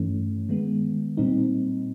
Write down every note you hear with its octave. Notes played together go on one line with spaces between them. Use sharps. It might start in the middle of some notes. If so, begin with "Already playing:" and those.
Already playing: G2 E3 A3 C#4
D#3 G#3 B3
A#2 G3 C4 D#4